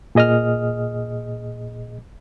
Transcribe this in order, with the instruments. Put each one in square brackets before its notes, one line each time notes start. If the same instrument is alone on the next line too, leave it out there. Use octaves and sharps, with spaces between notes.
[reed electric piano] A#2 G#4 D#5 D#6 F6